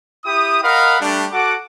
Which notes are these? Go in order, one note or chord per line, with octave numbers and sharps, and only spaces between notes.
E4 G4 D#6
A#4 D#5 F5 F#5 B5
G3 A3 D4
F#4 A4 F#5 D6